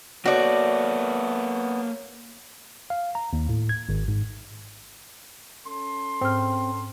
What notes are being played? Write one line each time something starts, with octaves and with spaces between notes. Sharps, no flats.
A#3 B3 F#4 A4 C#5 D5
F5
A#5
D#2
A2
G#6
G#1
G#2
C#4 A4 C6
G#2 C4 F6